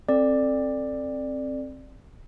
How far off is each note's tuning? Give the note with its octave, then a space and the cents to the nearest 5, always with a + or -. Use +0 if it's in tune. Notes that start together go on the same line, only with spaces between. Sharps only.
C4 +20 A4 +5 D5 +10